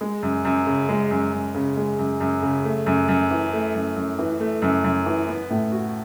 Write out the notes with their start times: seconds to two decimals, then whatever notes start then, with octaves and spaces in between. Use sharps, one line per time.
0.01 G#3
0.23 F#2
0.45 F#2
0.66 C#3
0.89 G#3
1.11 F#2
1.33 F#2
1.54 C#3
1.77 G#3
1.99 F#2
2.20 F#2
2.42 C#3
2.65 A3
2.86 F#2
3.08 F#2
3.30 E3
3.53 A3
3.74 F#2
3.96 F#2
4.19 E3
4.40 A3
4.62 F#2
4.84 F#2
5.06 E3
5.28 B3
5.50 A2
5.72 F#4